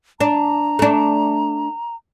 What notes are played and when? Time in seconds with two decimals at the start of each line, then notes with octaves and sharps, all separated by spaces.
0.20 D4 A#5
0.79 A3 D4